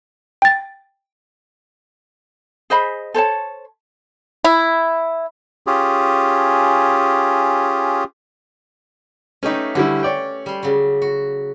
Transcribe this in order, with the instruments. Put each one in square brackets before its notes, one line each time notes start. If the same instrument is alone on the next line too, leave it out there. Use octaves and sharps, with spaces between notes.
[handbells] G5 A6
[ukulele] G#4 C5 D#5 B5
A4 C5 C#5 A5
[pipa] E4
[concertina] C#4 F4 G4 G#4
[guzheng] A3 G4 B4 [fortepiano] C#4 D#4
[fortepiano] D3 G3 E4 [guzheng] C#4
[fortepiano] C#5 D5 G5
[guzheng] G3 C6
C#3 F#3
F#4